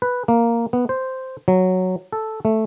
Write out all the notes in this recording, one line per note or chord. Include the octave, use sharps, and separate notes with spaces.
B4
A#3
B3
C5
F#3
A4
A3